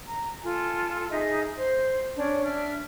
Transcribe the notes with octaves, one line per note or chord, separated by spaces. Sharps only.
A#5
F4 A4 G#5
D#4 G#4 D#5 E5
C5 C6
C#4 D4 C#5
D4 E5 F6